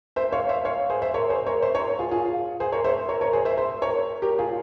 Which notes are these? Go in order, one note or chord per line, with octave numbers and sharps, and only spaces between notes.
C5 E5
C#5 F5
C5 E5
C#5 F5
G#4 C5
C5 E5
A#4 C#5
G#4 C5
A#4 C#5
C5 E5
A#4 C#5
F4 G#4
F4 G#4
G#4 C5
A#4 C#5
C5 E5
A#4 C#5
A#4 C#5
G#4 C5
C5 E5
C5 E5
A#4 C#5
G4 A#4
F4 G#4